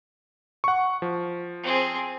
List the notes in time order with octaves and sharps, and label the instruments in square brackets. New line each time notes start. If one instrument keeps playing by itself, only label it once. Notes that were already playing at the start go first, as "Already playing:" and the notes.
[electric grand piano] F#5 C#6
F3
[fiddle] C4 G#4